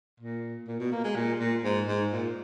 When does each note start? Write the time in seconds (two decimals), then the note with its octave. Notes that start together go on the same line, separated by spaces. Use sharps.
0.20 A#2
0.68 A#2
0.80 B2
0.92 A#3
1.04 G#3
1.16 A#2
1.40 A#2
1.64 G#2
1.88 G#2
2.12 A#2